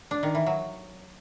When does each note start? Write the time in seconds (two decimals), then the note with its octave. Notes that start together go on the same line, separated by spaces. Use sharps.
0.11 D4
0.23 D#3
0.35 E3
0.46 F#3